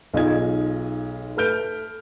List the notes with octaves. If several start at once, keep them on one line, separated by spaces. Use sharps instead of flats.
B1 D#4 F4 G#4 D#5 G#6
A3 B4 F6 G6 D7